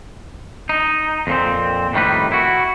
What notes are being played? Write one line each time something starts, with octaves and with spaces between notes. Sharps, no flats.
D#4
F2 A#2 C4
F2 A2 D#3 G3 B4
E4 F#4